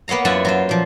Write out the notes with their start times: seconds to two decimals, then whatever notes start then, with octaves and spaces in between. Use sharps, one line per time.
0.08 A#3 B3 C#5 F5 A#5
0.25 F#2 E4 F4 E5 F#5 G#5
0.45 F#3 F4 C5
0.69 A#2 F3